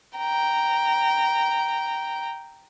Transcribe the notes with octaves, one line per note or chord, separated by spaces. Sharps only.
G5 A#5